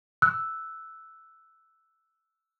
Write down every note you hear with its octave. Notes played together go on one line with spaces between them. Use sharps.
E6 F#6